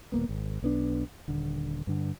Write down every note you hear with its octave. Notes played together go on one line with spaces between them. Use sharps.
D#1 G#1 A#3 B3
G#1
B1 B3 D4
D#1 D3
G2 D3